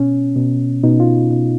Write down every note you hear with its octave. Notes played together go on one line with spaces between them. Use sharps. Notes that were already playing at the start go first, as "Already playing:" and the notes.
Already playing: B2 C#4
B2
B2 D#4
F4
B2